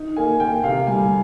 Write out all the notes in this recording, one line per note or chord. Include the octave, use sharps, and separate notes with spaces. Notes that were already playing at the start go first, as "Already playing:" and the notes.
Already playing: D#4
A#3 G#5
A#3 G5
C3 F5
G3 G#5